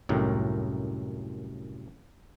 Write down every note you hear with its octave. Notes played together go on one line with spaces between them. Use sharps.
C2 F#2 A2 D#3